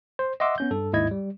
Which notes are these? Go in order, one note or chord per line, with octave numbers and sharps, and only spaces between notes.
C5
D#5 E5 F#5 C6 D6 E6
B3 C#4 G6
G2 A4
D#2 G#2 E4 D#5 G#6
G3